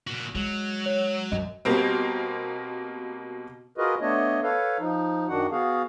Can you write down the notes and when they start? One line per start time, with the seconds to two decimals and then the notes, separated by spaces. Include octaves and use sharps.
0.07 A#2 F#4
0.35 F#3 G#3
0.86 C#5
1.32 F#2 D#5
1.65 B2 G3 A#3 C4
3.78 F4 F#4 G#4 A#4 B4 D#5
4.01 A3 B3 D4 C#5 D#5
4.43 A4 B4 C#5 F5
4.79 F3 D#4
5.29 F#2 D#3 D4 F#4 F#5
5.51 B3 F#4 G#4 F5